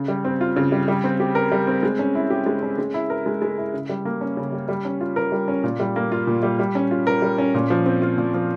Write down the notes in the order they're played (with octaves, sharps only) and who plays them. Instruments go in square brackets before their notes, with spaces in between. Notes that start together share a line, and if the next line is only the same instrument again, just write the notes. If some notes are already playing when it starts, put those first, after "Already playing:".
Already playing: [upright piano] C#3
G3
C4
F4
C#3
G3
G3
C4
G4
A#4
G3
C4
G#3
C#4
E4
G4
G#3
C#4
G#3
E4
A#4
G#3
G#3
E4
C#3
G3
A#3
C#4
C#3
G3
G3
C#4
F4
A#4
G3
C#4
A#2
G3
A#3
F4
A#2
G3
G3
C#4
F4
A#4
G3
C#4
A#2
F3
C4
F4
A#2
F3